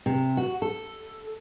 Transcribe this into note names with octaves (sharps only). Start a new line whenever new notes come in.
C3
F#4
A4